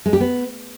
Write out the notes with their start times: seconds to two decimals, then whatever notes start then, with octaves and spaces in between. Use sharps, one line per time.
0.06 G#3
0.13 G4
0.20 B3